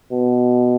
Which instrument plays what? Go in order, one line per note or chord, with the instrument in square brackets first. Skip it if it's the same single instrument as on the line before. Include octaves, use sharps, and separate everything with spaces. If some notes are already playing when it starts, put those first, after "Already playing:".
[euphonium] B2